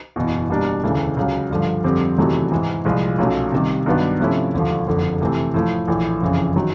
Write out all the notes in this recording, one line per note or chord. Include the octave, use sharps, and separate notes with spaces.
F#1 E2 B2
B2 G3 A#3 D4
E1 D2 C#3 E3 A3
C#2 C#3 F#3
G2 D3 F3
F2 D3 G3 C4
E2 C3 D#3 F#3 A3
G#2 E3 G#3
C2 A#2 F3 G#3
B1 A#2 F#3 A3 C#4
C3 D#3 G3
G2 D#3 F#3 B3 D4
C3 F3 A3 C#4 E4
E1 D#2 D3 F3
F#1 F2 D3
C3 E3 A3 C4
A2 F3 A3
A#1 A2 E3
F#1 F2 C#3 E3
D#3 F#3